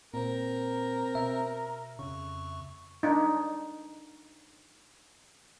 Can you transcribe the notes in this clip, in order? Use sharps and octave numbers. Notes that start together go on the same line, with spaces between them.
A#2 C4 A#4 C5
B2 E5
F2 C#3 C#6
D4 D#4